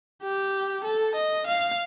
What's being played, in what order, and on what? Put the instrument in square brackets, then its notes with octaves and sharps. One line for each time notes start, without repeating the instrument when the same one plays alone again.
[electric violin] G4
A4
D#5
F5